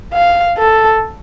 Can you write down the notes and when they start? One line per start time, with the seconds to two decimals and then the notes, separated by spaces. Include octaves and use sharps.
0.13 F5
0.58 A4